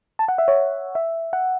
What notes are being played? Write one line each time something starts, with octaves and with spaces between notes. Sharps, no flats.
A5
F#5
E5
C#5
E5
F#5